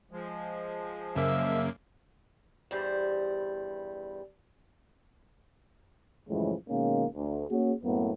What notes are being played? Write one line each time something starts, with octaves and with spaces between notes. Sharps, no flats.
F3 G#3
F#2 C#3 A#3 E5
E2 G2 G3 C5
F#2 A2 C#3 E3 F3 G#3
B2 D#3 G#3 A#3 C#4
D2
A#3 C#4 F#4 G#4
F#2 A2 A#3 B3